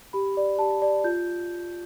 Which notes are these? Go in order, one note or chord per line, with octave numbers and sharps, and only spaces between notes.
G4 B5
D5
G4 A5
D5
F4 G6